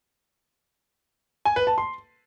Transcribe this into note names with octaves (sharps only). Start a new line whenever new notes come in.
G#5
B4
A5
C6